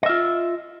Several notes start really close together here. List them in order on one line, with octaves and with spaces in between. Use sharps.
D#5 E5 F4